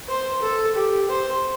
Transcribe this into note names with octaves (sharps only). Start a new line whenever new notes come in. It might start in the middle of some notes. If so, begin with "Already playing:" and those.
C5
A4
G4
C5